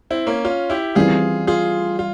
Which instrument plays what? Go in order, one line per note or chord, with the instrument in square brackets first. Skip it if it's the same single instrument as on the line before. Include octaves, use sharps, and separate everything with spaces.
[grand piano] C4 E4
A#3 C#4
C#4 F4
E4 G4
[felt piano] E3 G3 C4 [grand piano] F4 G#4
[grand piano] F4 G#4
F4